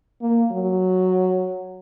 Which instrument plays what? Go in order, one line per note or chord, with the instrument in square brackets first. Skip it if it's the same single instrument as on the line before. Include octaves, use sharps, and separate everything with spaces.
[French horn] A#3
F#3